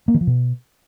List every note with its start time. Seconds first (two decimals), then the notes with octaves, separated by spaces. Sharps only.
0.08 A#3
0.14 E3
0.21 F3
0.27 B2